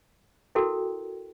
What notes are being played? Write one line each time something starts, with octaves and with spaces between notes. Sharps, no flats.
E4 F#4 A4 A#4 G5